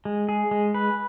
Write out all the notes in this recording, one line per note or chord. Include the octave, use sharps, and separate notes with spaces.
G#3
G#4
G#3
B4